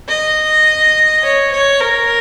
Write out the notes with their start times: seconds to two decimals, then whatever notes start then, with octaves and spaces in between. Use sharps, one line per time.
0.08 D#5
1.23 C#5
1.52 C#5
1.80 A#4